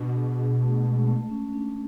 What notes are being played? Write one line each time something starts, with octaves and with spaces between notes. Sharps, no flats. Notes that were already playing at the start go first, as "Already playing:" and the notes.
Already playing: B2 D4 F#4
G#4
G#4
A3
G#3
A3
C#4
D4